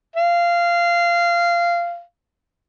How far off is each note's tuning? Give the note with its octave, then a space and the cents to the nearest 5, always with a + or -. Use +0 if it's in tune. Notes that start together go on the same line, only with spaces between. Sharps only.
F5 -15